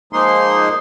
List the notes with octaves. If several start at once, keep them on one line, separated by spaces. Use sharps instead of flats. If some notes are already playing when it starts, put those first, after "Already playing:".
F3 G#3 A#3 D#4 C6